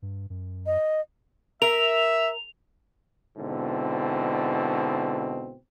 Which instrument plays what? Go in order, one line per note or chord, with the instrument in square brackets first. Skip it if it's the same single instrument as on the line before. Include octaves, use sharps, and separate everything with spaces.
[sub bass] G2
F#2
[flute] D#5
[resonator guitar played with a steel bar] A#4 [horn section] E5 [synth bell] F7
[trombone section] G#2 B2 D3 C4 E4